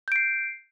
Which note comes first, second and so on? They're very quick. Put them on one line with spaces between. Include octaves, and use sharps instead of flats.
G6 D7 C7